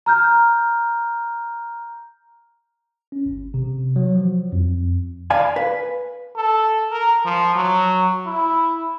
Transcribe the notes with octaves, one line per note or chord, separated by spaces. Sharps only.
A#5 F6 G6
C#4
G1
C3
F#3
F3
F2
D5 F5 G#5 B5
B4
A4
A#4
F3
F#3
E4